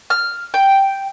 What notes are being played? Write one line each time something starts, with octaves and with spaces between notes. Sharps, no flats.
F6
G5